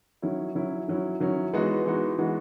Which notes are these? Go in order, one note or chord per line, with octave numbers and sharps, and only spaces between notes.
D#3 F#3 C#4 E4
D#3 F#3 C#4 E4
D#3 F#3 C#4 E4
D#3 F#3 C#4 E4
E3 G#3 B3 D#4 F#4
E3 G#3 B3 D#4 F#4
E3 G#3 B3 D#4 F#4